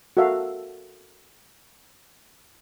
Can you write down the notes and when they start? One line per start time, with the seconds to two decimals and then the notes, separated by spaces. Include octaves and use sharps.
0.17 F#4 A4 A#4 E5 F5